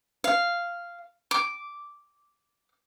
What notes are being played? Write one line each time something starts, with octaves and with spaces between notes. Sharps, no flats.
F5
D6